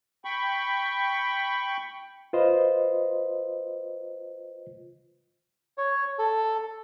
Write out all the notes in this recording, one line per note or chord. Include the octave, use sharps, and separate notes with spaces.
G5 B5 C#6
F4 B4 C5 D#5
C#5
A4